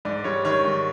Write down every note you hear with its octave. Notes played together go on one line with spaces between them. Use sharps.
G#2 D5
G3 C#5
D#3 C#5
G#2